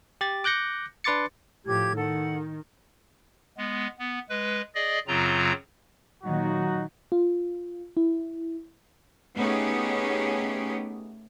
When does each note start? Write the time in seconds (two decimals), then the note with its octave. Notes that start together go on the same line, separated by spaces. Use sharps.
0.21 G4 A6
0.44 D6 F#6 G6 A#6 C#7
1.04 D4 B4 C6 D6 A6 C#7
1.66 A2 F3 G4 G#6
1.96 D#3 A4 F#5
3.57 G#3 B3
3.99 B3
4.29 G#3 B4
4.75 G#4 D5 D#5
5.07 F#2 C#3 F#3 C4 F4 A#5
6.24 A#2 D#3 F#3 D#4 F#4
7.12 F4
7.97 E4
9.35 A3 B3 C#4 D#4 G4 G#4